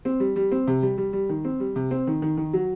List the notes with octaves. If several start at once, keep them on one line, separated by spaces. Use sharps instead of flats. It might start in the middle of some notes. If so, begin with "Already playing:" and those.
C4
G3
G3
C4
C3
G3
G3
G3
D#3
C4
G3
C3
C4
D#3
D#3
D#3
F#3